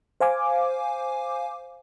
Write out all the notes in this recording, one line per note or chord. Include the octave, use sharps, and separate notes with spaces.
C5 F5 G#5 D6